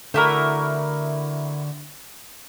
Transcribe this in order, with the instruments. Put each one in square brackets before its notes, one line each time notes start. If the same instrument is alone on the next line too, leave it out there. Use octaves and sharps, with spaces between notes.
[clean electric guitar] D3 F#4 [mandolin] A3 E4 A#4